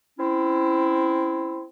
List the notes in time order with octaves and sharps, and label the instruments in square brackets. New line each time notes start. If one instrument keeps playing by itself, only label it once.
[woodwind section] C4 C#4 E4